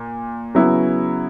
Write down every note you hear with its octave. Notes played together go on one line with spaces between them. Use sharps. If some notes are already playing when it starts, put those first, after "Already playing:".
Already playing: A#2
C#3 F#3 B3 E4